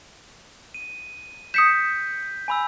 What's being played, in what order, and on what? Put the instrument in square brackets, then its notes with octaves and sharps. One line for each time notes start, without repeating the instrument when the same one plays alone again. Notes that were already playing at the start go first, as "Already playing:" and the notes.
[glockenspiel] D#7
[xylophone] D#6 C#7 E7 [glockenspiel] G6 B6
[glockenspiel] G#5 B5 E6